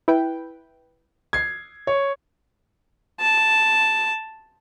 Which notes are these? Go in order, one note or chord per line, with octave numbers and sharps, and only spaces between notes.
E4 B4 G5
G#6 C7
C#5
A5